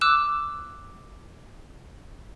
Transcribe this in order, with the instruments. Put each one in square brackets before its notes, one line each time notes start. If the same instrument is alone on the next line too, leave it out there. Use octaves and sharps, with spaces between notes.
[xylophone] D6 E6 F#6 E7